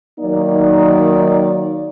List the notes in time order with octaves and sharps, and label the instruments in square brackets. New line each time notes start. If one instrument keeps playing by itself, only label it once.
[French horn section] D#3 F#3 A#3 D#4 D5